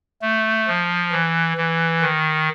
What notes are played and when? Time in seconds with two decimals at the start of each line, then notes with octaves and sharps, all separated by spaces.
0.22 A3
0.67 F3
1.12 E3
1.57 E3
2.02 D#3